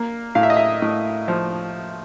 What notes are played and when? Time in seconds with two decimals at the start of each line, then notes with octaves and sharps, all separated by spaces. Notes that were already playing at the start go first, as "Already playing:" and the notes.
Already playing: A#3
0.35 A2 F5
0.43 E5
0.50 D#5
0.57 E5
0.82 A2
1.28 F3